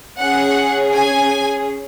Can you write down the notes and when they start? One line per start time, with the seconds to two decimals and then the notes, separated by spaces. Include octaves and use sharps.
0.20 C#4 G#4 F#5
0.95 G#5